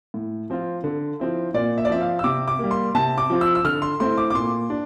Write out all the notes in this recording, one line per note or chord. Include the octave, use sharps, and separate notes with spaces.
A2
F3 C4 F4
D3
F3 C4 E4
A#2 D5
E5
D5
F3 C4 E5
F5
E6
C3 D6
D6
G3 A#3
C6
C3 A5
D6
F3 C4 F4
E6
E6
D3 F6
C6
A3 C4 E4 C6
D6
D6
A#2 C6
D4